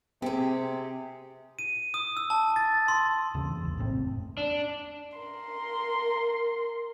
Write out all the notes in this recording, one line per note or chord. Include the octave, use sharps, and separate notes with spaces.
C3 C4 G4 G#4
D#7
D#6
E6
A5
A6
C6
D#2 C#3 E3
A#1 E2
F#1 A2 C#3 C4
D4
A#4 C6